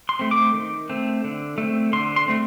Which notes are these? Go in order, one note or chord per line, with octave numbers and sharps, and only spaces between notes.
C6
A3 C4
D6
D#3
A3 C4
D3
A3 C4
D3 C6
C6
A3 C4